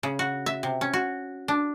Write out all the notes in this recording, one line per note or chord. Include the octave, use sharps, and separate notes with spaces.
C#3
F#4
E5
C3
C#4
F#4
D4